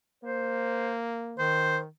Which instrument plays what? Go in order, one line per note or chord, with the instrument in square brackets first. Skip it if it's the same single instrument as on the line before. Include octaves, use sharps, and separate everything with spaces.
[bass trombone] A#3 [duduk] C5
[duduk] D#3 [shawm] C5